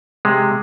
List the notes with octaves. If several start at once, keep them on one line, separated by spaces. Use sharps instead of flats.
C3 G#3